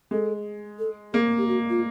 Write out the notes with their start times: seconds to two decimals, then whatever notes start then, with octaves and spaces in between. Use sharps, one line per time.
0.11 G#3 A4
0.79 A4
1.13 A#3 G#4
1.38 G4
1.48 F#4
1.70 F4